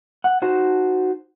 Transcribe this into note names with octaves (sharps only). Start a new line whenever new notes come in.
F#5
D#4 F#4 C5 A5